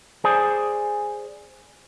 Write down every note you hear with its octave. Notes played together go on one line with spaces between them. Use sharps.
G#4 C5 D5 G#5